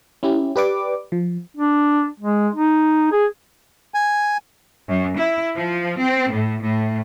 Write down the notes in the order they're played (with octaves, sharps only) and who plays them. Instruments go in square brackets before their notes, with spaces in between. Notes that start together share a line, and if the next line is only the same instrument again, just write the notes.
[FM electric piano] C#4 E4 G4
G4 B4 D5 D6
F3
[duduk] D4
G#3
D#4
G#4
[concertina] G#5
[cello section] F#2
E4
F3
C4
A2
A2